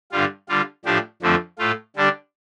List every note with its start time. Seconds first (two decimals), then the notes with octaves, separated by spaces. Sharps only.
0.12 G2 D3 G3 F4
0.49 D3 G3 F4
0.85 A2 F3 D4 G4
1.22 F2 D3 F3 A3 C4
1.58 A2 A3 F4
1.96 D3 G3 D4 G4